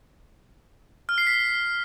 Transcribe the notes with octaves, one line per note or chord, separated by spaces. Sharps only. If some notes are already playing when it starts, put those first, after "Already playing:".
F6
C7
B6